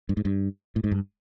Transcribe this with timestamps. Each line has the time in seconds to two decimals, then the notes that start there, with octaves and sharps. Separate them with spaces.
0.09 G2
0.17 G#2
0.25 G2
0.76 A2
0.84 G#2
0.92 G2